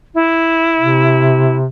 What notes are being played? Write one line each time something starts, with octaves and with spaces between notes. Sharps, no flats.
E4
C3